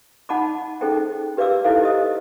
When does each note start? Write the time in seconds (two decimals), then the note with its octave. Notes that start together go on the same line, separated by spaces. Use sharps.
0.29 D#4 F#5 A5 B5 D6
0.81 C#4 D#4 G#4 A4 C5 G5
1.37 G4 B4 D5 F5 D6 E6
1.64 D#4 E4 A4 B4 C5 F5
1.81 G4 C5 D#5 F5 D#6